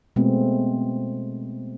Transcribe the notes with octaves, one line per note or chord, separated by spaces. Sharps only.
B2 G#3 A3 B3 C4